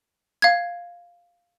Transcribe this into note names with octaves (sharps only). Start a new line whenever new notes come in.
F5 G#6